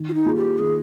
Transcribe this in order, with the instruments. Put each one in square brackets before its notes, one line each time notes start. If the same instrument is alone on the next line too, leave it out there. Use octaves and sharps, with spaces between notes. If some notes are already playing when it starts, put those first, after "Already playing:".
Already playing: [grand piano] D#3
[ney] F4
D#4
[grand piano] A#3 F4 G#4
[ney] G4
[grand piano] D#3 [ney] G#4